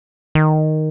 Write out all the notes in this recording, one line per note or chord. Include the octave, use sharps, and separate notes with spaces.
D#3